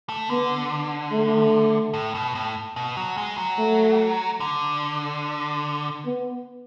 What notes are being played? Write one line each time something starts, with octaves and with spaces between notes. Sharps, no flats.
A3
D3 B3
A3
A2
B2
A2
B2
F#3
G#3
F#3
A3
D3
B3